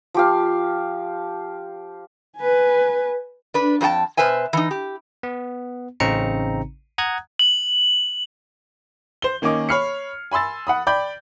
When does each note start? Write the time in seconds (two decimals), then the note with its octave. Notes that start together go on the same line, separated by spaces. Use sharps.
0.14 F3 G4 F5
2.37 B4 G#5
3.54 D4 B4
3.81 F2 C4 F#4 G5 A5
4.17 B2 B4 C5 E5 G#5
4.53 E3 D#4
4.71 G4
5.23 B3
6.00 A1 C#3 C4 D#4 A#5 C#7
6.98 F#5 A#5 D#6 F#6 G#6
7.39 F#7
9.22 C5 G7
9.42 D#3 A#3 C#4 D#5 D6
9.69 C#5 B5 F6 C7 C#7
10.32 G#5 B5 C6 E6 A6
10.67 F#5 B5 D#6
10.87 D5 G5 B5 G6